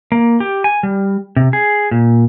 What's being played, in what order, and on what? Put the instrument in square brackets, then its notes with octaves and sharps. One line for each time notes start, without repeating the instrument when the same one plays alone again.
[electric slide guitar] A#3
G4
G#5
G3
C3
G#4
A#2